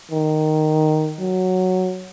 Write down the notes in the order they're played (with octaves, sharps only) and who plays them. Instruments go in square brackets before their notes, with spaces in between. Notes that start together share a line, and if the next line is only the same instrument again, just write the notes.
[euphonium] D#3
F#3